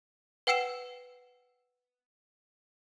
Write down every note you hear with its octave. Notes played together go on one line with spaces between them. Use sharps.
B4 F#5 G5 E6 C7 E7